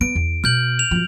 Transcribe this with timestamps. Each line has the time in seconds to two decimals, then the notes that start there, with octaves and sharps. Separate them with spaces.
0.01 B3 D7
0.15 E2
0.44 B2 F6 G6 F#7
0.79 F7
0.91 F#2 F3